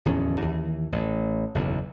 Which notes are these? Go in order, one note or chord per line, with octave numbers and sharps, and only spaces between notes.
D1 E2 F3 C#4
D#2 E3
A1
F#1 B1 E2